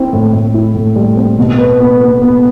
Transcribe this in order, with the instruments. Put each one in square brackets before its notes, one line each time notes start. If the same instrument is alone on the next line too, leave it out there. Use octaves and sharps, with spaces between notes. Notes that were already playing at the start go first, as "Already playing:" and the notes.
Already playing: [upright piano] C4 E4
A2
A2
E4
A2
G3
C4
B2
B4
B3
B3
B3